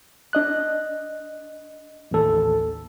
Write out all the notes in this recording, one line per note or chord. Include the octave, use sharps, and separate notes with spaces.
D4 D#5 F#6
A1 D#2 A4